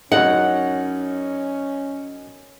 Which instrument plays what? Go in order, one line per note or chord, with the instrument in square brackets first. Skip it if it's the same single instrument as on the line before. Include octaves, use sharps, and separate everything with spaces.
[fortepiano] F#2 D#4 [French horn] C#4 [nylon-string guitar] F#5